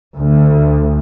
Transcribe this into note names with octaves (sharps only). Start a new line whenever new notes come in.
D2